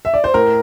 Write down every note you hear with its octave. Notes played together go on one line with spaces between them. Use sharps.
E5
D5
C5
A2 A#4